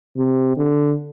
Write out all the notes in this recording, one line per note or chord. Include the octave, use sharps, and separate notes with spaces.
C3
D3